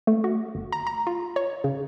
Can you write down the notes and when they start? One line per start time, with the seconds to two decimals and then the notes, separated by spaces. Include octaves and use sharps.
0.07 A3
0.24 F#4
0.55 G1
0.72 A#5
0.87 A#5
1.07 F4
1.36 C#5
1.64 C#3